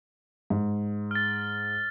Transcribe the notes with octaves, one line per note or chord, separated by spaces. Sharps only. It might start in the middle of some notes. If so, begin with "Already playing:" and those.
G#2
F6 A6